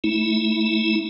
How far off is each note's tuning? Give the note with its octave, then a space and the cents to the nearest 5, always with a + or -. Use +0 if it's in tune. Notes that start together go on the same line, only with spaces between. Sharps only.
A3 +0 E4 -25